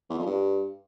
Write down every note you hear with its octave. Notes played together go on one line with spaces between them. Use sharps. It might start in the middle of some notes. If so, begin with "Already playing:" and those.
E2
F2
G2